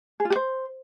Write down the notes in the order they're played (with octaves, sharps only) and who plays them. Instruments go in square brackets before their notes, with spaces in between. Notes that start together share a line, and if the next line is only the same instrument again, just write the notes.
[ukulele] G#4
F4
G4
C5